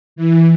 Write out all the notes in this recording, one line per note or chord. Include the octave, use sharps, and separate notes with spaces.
E3